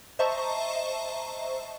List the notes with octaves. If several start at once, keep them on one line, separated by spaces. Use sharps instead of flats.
C5 D#5 E5 A5 A#5 C#6